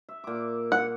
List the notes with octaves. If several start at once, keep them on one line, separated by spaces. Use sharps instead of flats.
E5
A#2 D6
F#5